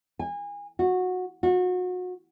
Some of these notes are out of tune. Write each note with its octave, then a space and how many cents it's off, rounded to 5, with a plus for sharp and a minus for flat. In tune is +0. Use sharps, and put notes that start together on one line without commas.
G#5 -30
F#4 -15
F#4 -30